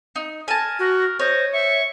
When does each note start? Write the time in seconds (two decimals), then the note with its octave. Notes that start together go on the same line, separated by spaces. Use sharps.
0.16 D#4
0.48 A#4 G#5 A5
0.79 F#4 A#4
1.20 C5 C#5 D#5
1.53 E5 C#6